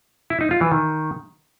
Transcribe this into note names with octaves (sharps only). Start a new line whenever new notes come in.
E4
D#4
F4
E3
D#3